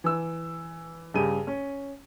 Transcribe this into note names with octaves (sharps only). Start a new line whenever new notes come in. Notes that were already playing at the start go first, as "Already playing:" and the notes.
E3 E6
G2 C#3 G4 D#7
C#4